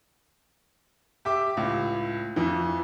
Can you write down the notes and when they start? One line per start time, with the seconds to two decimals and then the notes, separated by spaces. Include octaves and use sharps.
1.25 G4 E5 D6
1.57 C#2 A2
2.36 F2 E3